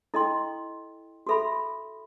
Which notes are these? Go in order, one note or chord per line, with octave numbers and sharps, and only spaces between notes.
E4 A4 D#5 G5 C6
F#4 A4 E5 B5